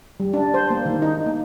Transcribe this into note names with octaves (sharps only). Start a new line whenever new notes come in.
G3
D4
C5
A#3
D#3
D#4
A#3